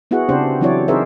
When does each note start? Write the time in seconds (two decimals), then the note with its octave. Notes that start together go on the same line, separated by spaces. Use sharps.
0.11 B3 E4 F#4 G#4 F#5
0.29 C#3 C4 D4 G4 C5
0.61 E3 F#3 C4 E4 C#5 D5
0.88 C4 D#4 G#4 A#4 C5 E5